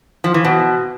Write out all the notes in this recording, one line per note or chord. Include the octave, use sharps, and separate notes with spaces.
F3
E3
B2